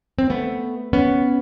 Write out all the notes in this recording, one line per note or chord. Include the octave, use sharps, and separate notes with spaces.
C4
A3 B3
B3 C#4